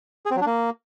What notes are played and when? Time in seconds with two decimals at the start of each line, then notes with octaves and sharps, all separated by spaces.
0.26 G#4
0.31 C4
0.36 F#3
0.41 D4
0.46 A#3